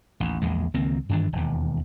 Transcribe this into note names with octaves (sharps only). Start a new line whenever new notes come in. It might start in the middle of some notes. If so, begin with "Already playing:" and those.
A1 D#2
A#1 E2 G#3
C#2 D#3 A#3 C4
G2 D#3 E3 D4
E1 D#2